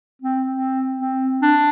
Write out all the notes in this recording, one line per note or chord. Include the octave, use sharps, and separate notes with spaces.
C4
C4
C4
D4